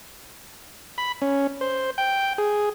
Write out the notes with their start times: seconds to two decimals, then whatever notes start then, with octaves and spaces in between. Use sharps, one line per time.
0.98 B5
1.22 C#4
1.61 C5
1.98 G5
2.38 G#4